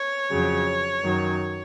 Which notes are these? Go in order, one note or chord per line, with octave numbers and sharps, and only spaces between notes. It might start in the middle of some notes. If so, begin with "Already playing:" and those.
Already playing: C#5
F2 C#3 F#3
F#2 D#3 F#3